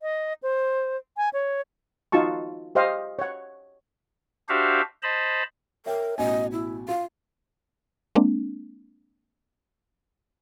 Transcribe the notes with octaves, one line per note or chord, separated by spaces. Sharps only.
D#5
C5
G#5
C#5
D#4 F4 F#4 A5 C#6
G4 C5 D#5 F5
C#5 F#5
D4 F#4 G4 C5 E5 F5
C5 D#5 A5 B5
A#4 C#5 E5 G5
A1 B2 D#5 G#5
E4
F4 F5
G#3 A#3 C4 D4